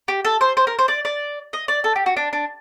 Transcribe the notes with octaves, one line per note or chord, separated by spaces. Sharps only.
G4
A4
C5
C5
A#4
C5
D5
D5
D#5
D5
A4
G4
F#4
D4
D4